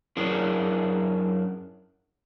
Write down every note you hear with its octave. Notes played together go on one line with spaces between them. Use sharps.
F#2 C#4 D4 E4 G#4 A#4